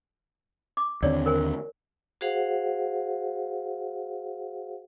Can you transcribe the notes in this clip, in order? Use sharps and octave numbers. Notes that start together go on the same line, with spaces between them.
D6
D#2 D3 C4 C#5 D5
A#4 C5 G#5
F#4 G#4 C5 F5 F#5